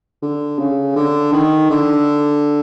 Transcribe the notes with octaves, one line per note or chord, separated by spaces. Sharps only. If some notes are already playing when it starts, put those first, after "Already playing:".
D3
C#3
D3
D#3
D3